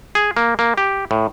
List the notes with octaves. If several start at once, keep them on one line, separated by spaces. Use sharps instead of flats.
G#4
A#3
A#3
G4
A2